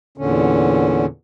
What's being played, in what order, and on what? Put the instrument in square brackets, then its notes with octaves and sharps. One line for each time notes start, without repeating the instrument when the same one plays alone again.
[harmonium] E2 A#2 D3 C#4